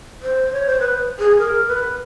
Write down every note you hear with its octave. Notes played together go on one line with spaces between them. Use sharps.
C5
C#5
C5
B4
G#4
A#4
B4